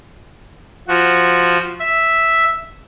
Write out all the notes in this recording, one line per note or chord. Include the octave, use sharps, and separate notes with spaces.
F3 F#4
E5